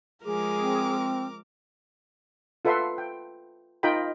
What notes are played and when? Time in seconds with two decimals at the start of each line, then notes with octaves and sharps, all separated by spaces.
0.25 F3 G#3 G#4 A#4 D6
0.58 C4
2.65 F4 A4 B4 E5 F#5 C6
2.98 G5
3.83 D#4 F4 A#4 D#5 G5 B5